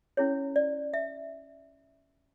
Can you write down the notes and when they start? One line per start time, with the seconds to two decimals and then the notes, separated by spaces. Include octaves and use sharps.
0.17 C#4 E4 G#4 C#5
0.56 D5
0.94 E5